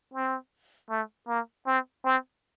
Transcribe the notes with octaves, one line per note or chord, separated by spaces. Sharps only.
C4
A3
A#3
C4
C4